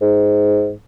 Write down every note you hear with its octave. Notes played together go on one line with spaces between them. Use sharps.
G#2